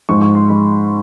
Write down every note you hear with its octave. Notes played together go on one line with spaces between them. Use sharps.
G#2 F3 G#3 C#6
C#6
C6
F3 G#3 B5